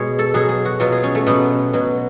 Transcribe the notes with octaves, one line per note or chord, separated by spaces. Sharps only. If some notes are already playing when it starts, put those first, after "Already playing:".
Already playing: B2 G#3 C#5
A4
B2 F#3 G#4
G#4
F#4
B2 F#3 F4
G#4
C#4
A3
B2 F#3 B3
B2 F#3